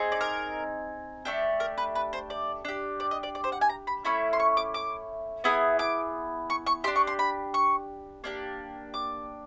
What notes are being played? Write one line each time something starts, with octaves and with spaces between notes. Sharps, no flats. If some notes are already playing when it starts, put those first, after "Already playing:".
Already playing: C4 D#4 G#4
D5
A#4
A3 D4 G4
A#4
B4
B4
C5
D5
D4 G4
D5
D#5
D5
D5
C5
F#5
G#5
A#5
B5
A3 C#4 E4 B5
C6
C#6
D6
D6
B3 E4 G#4 D#6
D6
C#6
C#6
D4 G4 C6
C#6
C6
B5
C#6
A#3 D4 G4
D6